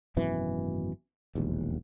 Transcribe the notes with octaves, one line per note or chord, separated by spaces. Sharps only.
G#1 F#2 B2 E3
E1 A#1 D#2